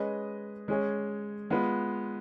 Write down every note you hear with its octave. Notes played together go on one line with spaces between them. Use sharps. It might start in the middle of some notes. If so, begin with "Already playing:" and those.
Already playing: G#3 C#4 G#4 B4 D#5
G#3 C#4 G#4 C#5
G#3 B3 F4 B4